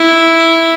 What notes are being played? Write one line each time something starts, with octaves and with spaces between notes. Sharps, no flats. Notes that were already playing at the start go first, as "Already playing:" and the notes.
Already playing: E4